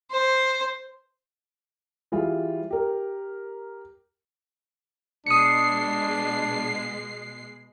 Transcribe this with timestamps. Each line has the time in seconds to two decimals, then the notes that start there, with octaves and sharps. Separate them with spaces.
0.11 C5
2.12 E3 G3 F4 G#4
2.71 G4 A#4
5.26 B2 G#3 D4 D#6 C7 C#7